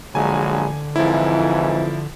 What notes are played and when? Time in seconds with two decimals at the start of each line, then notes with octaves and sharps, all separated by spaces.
0.15 A#1 D3 F#3 G#3 G#5
0.96 F2 G#2 E3 F3 E4